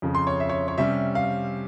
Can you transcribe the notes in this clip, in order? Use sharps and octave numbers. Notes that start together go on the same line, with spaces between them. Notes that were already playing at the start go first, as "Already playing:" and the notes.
F2 C#3 F3
C6
C#5
E5
C#5
C#5
C3 G3 C#4 E5
F5